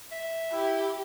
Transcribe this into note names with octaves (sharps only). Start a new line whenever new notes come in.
E5
E4 G4